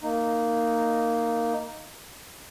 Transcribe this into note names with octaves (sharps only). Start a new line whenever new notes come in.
A#3 D#4